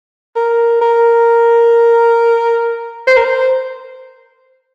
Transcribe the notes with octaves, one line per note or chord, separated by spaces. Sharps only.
A#4
A#4
C5
A#4
C5